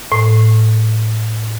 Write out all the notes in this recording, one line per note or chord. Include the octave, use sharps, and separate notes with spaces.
A2